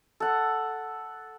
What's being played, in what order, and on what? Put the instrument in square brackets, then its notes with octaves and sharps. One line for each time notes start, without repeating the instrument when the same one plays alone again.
[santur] A4 F#5